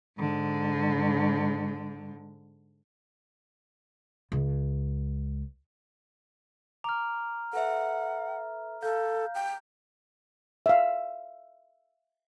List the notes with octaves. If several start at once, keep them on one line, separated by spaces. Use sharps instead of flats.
G#2 D3
C#2
A#5 D6 F6
A4 B4 E5 F#5
A4 F5 G6
G5
E5 F5